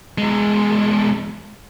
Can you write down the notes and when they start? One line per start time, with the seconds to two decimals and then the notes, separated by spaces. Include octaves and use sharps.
0.18 E2 G#3